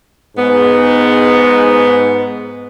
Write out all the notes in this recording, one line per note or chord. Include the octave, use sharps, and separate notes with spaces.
G#2 B3